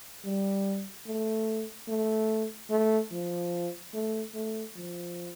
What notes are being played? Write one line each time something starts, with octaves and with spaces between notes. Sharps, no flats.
G3
A3
A3
A3
F3
A3
A3
F3